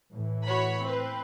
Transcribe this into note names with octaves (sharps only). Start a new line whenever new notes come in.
A2 E3
F#4 C#5 B5
C4 B4